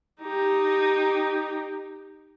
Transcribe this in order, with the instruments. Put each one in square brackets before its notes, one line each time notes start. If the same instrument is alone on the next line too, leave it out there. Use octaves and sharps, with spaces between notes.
[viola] D#4 G4